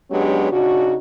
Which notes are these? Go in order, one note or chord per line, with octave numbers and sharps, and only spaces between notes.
F#3 G#3 B3 C#4 D4 G4
C#3 D4 D#4 F#4